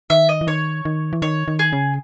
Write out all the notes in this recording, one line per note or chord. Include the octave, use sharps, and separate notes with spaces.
D#3 E5
D#5
E3
D#3 C#5
D#3
E3
D#3 C#5
D#3
G#4
C#3